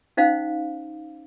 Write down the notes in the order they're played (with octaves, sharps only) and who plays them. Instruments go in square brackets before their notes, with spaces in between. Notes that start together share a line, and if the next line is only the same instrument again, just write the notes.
[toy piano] C#4 D#4 C5 F5